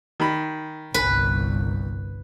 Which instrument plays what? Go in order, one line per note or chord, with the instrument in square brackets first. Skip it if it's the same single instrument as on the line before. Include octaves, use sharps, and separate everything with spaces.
[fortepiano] D#3 B5
[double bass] G1 C2 [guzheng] B4